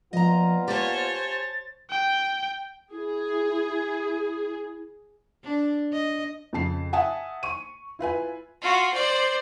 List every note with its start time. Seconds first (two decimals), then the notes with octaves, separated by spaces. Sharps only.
0.13 A#2 F3 B3 F4 D#5 A#5
0.68 G4 C5 C#5 G#5 A5 A6
1.90 G5
2.92 E4 G#4
5.43 D4
5.93 D#5
6.53 F2 C#3 A5 C7
6.93 E5 F#5 G#5 A5 D#6
7.43 C#6 D#7
7.99 E4 F4 B4 G#5
8.61 F4 F#4
8.93 C5 D5